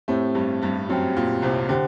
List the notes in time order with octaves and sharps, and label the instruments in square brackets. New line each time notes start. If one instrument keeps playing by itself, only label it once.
[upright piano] A2 A3 [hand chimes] C4 G4 C5 G5
[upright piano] G2 G3
G2 G3
[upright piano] F#2 F#3 [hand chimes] C4 G4 C5 G5
[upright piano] A#2
C2 C3
[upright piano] D3 [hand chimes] G4 C5 G5